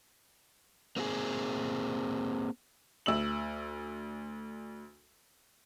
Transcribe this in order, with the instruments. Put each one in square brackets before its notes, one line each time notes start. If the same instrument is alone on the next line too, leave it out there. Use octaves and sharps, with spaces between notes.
[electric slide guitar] A#3 C4 F#4 G#4
[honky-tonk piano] D2 E6 F#7